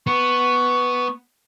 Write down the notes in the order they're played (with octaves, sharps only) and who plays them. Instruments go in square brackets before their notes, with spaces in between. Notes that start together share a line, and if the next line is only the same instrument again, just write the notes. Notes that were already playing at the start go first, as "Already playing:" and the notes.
[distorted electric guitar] B3 [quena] C#6